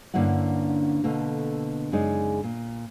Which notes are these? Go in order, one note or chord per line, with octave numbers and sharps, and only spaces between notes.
G2 D3 A#3 C#4 E4 F#5
B2 D3 A3 A#3
F#2 C#3 G#3 D#4 D5
A#2